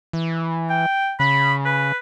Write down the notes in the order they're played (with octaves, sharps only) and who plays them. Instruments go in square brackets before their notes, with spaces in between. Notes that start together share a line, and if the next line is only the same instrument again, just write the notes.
[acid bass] E3
[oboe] G5
[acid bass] C#3 [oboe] B5
[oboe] B4